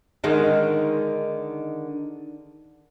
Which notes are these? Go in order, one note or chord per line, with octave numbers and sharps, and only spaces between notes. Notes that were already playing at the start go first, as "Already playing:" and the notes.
D3 D#3 G#3